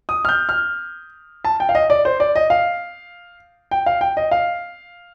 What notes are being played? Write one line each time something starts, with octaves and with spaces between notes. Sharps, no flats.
D#6
F6
G6
F6
A5
G5
F5
D#5
D5
C5
D5
D#5
F5
G5
F5
G5
D#5
F5